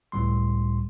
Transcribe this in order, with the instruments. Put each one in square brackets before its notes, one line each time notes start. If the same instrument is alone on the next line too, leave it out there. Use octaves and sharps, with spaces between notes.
[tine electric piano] C#2 A2 G3 C6